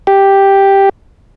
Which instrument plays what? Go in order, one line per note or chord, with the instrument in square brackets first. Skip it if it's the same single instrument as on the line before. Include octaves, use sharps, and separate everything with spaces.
[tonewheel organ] G4